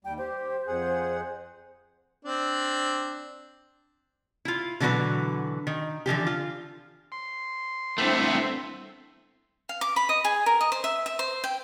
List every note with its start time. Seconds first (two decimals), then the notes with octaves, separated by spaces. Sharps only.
0.05 D#2 G3 G5
0.18 G4 C5
0.67 F2 G#4 F#5
2.25 C4 D4
4.45 E4 F4
4.80 B2 D3 E3 F#3 F#4 B4
5.67 D#3
6.06 D3 E3 F3 G4
6.27 F4
7.12 C6
7.98 G3 A3 B3 C4 D4 E4 E5
9.69 F5
9.81 D6
9.96 B5
10.09 D#5
10.25 G#4
10.46 A#4
10.61 D#5
10.72 C5
10.84 E5
11.06 E5
11.19 C5
11.44 G5